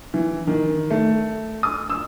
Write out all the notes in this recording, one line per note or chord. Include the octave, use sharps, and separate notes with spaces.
E3
D#3
A3
D#6
E6